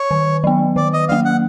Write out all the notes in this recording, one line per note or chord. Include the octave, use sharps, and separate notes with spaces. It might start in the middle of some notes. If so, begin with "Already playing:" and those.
Already playing: C#5
D#3
F#3 B3
D#3 D5
D#5
F#3 A#3 F5
F#5